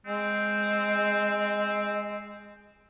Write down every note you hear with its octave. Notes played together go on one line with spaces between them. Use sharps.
G#3 C4